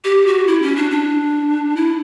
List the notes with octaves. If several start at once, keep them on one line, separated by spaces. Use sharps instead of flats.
G4
F#4
E4
C#4
D4
D4
E4